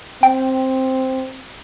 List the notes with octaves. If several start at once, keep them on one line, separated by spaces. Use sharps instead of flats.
C4 G5